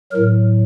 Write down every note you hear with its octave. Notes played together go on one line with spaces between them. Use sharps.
A2 F#3 A#4